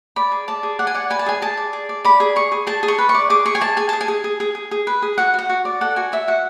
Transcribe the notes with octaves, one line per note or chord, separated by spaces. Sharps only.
D5 B5
G#4
D5 A5
G#4
D5 F#5
G#5
D5 F#5
B4 G#5
A5
G#4 G#5
G#4 A5
D5
G#4
D5
D5 B5
G#4
G#4 C#6
G#4
G#4 A5
G#4
C#6
B4
C#6
D5
G#4 D6
G#4 C#6
G#5
G#4 A5
G#4 G#5
G#4 A5
G#5
G#4
G#4
G#4
G#4
G#4
B4
G#4
F#4 F#5
F#4 F#5
F#4
D5
A4 F#5
F#4 G#5
F#4 E5
F#4 F#5